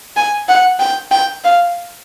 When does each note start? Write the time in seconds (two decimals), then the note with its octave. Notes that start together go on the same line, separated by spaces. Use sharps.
0.16 G#5
0.48 F#5
0.80 G5
1.11 G5
1.44 F5